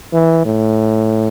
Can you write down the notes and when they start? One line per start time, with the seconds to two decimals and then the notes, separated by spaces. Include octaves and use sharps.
0.13 E3
0.45 A2